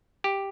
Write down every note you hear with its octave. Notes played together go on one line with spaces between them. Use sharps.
G4